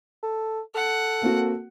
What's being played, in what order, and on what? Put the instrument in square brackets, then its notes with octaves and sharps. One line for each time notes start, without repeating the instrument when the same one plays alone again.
[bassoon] A4
[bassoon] A4 [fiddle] F#5
[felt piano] A#3 C4 F#4